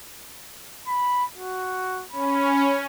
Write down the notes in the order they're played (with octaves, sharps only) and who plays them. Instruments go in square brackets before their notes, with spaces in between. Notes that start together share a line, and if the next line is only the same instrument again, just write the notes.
[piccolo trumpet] B5
F#4
[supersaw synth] C#4 [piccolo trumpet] B5